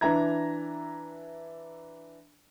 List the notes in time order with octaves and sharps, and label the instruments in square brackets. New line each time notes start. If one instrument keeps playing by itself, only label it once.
[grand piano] E3 D4 E5 A#5 G#6